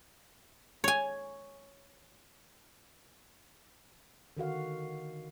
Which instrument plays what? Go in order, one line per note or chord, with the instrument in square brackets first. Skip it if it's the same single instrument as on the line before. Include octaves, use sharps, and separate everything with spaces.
[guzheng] C#5 G#5
[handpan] D3 D#3 F#4 F5